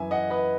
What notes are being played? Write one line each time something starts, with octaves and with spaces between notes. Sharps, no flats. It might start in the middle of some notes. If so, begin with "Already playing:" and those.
Already playing: F#2 E3 E5 G#5
D#5 F#5
B4 D#5